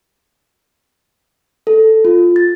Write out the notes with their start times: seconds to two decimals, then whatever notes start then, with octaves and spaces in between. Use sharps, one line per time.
1.67 A4
2.05 F4
2.36 A6